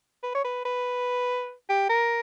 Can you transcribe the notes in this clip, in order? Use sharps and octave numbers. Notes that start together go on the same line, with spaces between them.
B4
C#5
B4
B4
G4
A#4